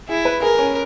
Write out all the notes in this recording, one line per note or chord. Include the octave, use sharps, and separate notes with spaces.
E4 G#4
B4
G#4 A#4
C#4